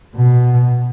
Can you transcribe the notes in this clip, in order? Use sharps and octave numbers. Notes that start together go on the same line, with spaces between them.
B2